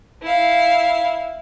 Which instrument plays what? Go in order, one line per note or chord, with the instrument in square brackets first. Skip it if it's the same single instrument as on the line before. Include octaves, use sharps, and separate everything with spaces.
[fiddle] E4 F5